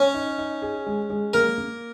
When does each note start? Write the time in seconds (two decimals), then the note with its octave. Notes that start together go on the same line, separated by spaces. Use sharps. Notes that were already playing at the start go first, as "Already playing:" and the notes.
Already playing: C#4 C#5
0.14 D#4
0.38 D#4
0.62 G#4
0.87 G#3
1.10 G#3
1.34 A#3 A#4
1.58 A#3